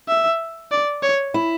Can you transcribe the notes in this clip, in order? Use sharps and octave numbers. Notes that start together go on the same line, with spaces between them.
E5
D5
C#5
E4